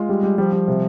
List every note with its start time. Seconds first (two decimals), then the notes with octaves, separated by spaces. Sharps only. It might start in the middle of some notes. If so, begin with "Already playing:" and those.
Already playing: G#3 F4
0.09 G3
0.23 G3
0.38 F3 G3
0.52 G3
0.68 C3